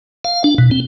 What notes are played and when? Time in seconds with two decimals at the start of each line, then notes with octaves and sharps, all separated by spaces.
0.25 F5
0.44 D4
0.58 B2
0.71 C4